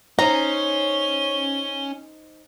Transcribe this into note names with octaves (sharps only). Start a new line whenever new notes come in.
C#4 D#4 C5 A#5 G7